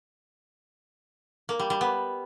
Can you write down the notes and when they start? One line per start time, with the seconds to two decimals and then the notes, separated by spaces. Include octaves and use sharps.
1.49 A#3
1.60 G3
1.70 G3
1.81 B3